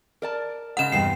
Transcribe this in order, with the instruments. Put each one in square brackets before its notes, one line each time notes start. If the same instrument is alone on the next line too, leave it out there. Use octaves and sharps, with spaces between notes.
[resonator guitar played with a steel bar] A#4 D5 A5
[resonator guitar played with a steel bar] G#2 C#3 G#3 [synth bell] F#5 E7
[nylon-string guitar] E2 G2 C3 [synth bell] C7